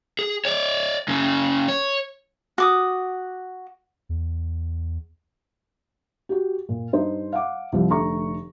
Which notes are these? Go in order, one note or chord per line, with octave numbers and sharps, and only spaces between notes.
G#4
C#5 D5
F#2 C#3
C#5
F#4 D6 D#6
E2
F#4 G4
A#2
G2 D#4 C5
F5 F#5 D6
C2 F3 G3
F1 D3 A3 A#5 C#6